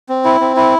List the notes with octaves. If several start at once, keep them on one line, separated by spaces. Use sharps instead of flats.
C4
E4
C4
E4